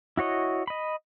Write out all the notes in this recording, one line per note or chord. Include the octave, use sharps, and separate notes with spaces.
E4 F#4 C#5 D#5
D#5 B5